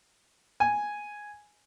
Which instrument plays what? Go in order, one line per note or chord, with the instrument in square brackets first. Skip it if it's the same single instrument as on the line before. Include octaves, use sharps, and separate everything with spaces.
[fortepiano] G#5